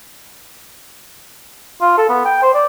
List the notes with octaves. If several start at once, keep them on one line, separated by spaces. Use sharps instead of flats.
F4
A4
B3
G5
C5
D5